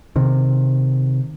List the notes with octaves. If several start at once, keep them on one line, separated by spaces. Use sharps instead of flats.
C3 D#3